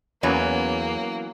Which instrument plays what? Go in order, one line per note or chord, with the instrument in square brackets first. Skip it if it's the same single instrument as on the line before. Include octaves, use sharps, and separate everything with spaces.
[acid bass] E2 [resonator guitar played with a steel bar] E3 F#3 B3 [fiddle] A#3 [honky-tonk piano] C#4